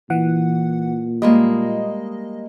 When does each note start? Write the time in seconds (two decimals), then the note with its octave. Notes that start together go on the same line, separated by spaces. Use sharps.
0.10 A#2 E3 F#5
1.22 G3 G#3 A#3 D#5